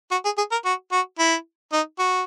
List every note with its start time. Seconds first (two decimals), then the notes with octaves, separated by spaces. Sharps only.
0.11 F#4
0.25 G#4
0.38 G#4
0.52 A#4
0.65 F#4
0.92 F#4
1.19 E4
1.72 D#4
1.99 F#4